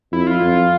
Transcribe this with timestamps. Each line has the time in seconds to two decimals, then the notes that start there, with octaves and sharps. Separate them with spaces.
0.12 F2 E4
0.27 F4
0.41 F2